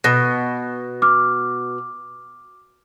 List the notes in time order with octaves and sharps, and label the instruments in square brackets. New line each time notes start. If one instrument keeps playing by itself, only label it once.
[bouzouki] B2 [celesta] A#6
[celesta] D6 F6